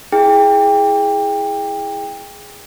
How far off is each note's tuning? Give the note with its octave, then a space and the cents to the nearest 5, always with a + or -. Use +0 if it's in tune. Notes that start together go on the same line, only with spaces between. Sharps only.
E4 -5 G#4 +0 G5 +20